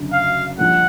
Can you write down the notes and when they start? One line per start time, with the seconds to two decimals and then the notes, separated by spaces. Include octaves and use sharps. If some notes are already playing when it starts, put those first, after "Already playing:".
Already playing: F#1 F#2 D3 F#3
0.13 F5
0.58 A#1 A#2 G3 A#3 F#5